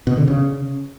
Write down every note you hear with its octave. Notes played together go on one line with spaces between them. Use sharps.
B2
D3
C#3